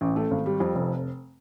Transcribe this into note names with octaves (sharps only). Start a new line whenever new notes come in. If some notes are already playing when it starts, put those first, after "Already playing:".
A1
A3
G#1
G3
F2
F1